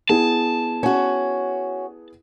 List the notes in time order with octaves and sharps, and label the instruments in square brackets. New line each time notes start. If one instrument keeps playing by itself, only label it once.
[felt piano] B3 E4 G#4 [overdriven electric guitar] A5
[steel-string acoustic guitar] C#4 F#4